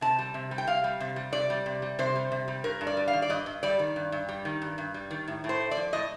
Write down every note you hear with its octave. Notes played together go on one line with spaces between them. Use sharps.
C3 A5
G3
C3
G3
G5
C3 F5
G3
C3
G3
C3 D5
G3
C3
G3
C3 C5
G3
C3
G3
G2 A#4
G2
D5
G3
F5
D#3
D5
G2 D#5
G2
G3 D5
D#3
G2
G2
G3
D#3
G2
G2
G3
D#3
A2
A2
C5
A3
D5
F3
A2 D#5